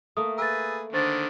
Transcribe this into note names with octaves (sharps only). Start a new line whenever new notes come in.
A3 A#3 D#6
G#4 B4 E6 A6
D3 D#3 D4 C5 A6